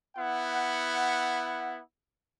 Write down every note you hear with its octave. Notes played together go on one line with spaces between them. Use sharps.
B3 E4 F#5